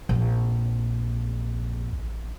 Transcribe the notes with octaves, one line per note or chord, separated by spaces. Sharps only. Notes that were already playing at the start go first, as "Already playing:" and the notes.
A#1 F2
A1